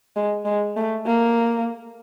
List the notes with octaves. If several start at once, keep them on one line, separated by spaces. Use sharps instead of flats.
G#3
G#3
A3
A#3